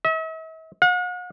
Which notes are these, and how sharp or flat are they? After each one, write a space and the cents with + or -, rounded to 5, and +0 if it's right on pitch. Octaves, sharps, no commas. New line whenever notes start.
E5 -45
F#5 -45